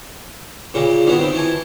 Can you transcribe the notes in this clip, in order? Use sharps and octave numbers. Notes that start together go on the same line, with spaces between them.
A#2 C#3 G3
D#3 E3 F#3 B3
D#3 C4
E3 G#5 A5